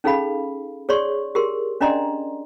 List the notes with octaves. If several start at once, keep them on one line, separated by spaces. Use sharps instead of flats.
C#4 D#4 G#4 A4 F5 B5
G#4 C#5 D5 C6 C#6
G4 G#4 A#4 C6
C#4 D4 D5 D#5 A#5 C6